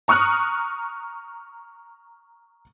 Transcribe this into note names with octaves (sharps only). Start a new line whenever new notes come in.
A#5 C#6 D#6 F6 F#6